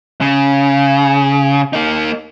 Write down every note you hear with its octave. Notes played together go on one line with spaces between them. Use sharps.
C#3
A#3 D#4